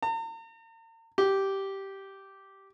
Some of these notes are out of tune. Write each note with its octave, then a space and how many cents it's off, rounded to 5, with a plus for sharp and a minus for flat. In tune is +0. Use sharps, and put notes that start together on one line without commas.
A#5 -45
G4 -10